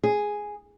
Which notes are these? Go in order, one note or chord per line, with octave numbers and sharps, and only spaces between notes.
G#4